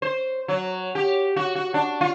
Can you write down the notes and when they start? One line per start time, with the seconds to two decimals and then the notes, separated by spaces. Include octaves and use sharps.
0.02 C5
0.48 F#3
0.95 G4
1.36 F#4
1.55 F#4
1.74 D4
2.01 F4